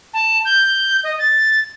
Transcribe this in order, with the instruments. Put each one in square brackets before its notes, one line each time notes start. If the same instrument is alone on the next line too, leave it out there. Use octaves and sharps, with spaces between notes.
[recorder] A5
G6
D#5
A6